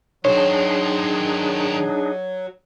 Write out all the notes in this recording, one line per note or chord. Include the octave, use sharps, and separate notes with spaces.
D#3 F#3 D4 D#4 G#4 C5 C#5